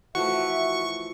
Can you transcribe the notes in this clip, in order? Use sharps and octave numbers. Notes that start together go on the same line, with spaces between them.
E3 F3 A3 F#4 E5 F#5 C#6